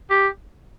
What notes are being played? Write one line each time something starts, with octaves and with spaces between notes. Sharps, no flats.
G4